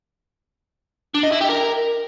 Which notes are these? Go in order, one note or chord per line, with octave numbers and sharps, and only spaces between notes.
D4
D#5
E4
G4
A#4